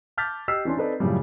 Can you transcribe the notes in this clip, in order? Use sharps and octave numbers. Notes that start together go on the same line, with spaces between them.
A5 D6 F6 G6 A6 B6
G4 D#5 E6 F6 B6 C7
E3 C#4 D4 C6
C4 D#4 A4 B4 D5
F#2 A2 C#3 F3 G3